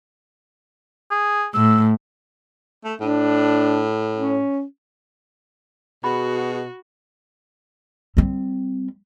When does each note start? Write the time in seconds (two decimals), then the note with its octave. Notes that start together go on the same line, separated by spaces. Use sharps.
1.11 G#4
1.54 A2 E6
2.84 A3
3.01 A2 D4
4.17 C#4
6.04 B2 F#4 G#4 B5
8.17 G3 C4